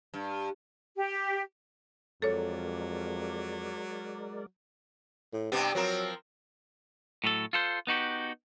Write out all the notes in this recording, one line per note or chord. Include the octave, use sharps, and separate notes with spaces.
G2
G4
F2 F#3 G#3 A4 A#4 C#5 D5
A2
G2 C3 B3 G4
F3 F#3 C4 A#4
A2 F#3 A4
F4 A4 C5
B3 D#4 F#4 G4